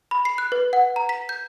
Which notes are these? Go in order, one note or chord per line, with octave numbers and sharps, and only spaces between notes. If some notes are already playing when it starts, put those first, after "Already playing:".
B5
C7
F#6
B4
F#5
A#5
B6
G6